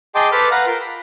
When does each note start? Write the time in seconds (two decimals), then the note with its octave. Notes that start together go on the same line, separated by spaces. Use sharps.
0.15 G#4 D#5 G5 A5 C6 D6
0.32 A4 B4 C5 B5 D6 F6
0.51 B4 F5 F#5 A#5
0.67 F4 A#4 C6
0.81 B5